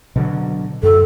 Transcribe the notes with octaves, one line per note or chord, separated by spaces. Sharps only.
B2 D3 F#3
F#2 A4